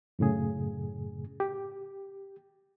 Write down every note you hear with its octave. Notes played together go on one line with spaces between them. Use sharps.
F#2 A2 C#3 G#4
G4